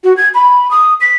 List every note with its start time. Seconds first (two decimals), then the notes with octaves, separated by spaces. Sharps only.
0.04 F#4
0.17 G#6
0.34 B5
0.71 D#6
1.01 B6